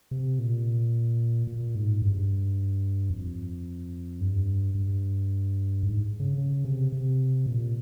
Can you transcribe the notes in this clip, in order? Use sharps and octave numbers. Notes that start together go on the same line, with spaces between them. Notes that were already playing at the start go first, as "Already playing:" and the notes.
C3
A#2
A#2
G#2
G2
F2
G2
G2
G#2
C#3
C#3
C3
C3
A#2